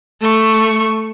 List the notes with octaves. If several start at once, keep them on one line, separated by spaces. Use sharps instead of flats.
A3 C#6